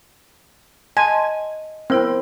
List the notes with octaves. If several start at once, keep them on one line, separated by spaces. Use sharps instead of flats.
D#5 G#5 A5 C6
B3 C4 E4 A#4